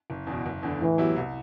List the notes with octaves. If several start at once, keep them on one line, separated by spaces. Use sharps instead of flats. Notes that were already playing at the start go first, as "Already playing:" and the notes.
F#1
E2 B2
F#1
E2 D3
A2 E3
F#3 B3 E4 G4
C2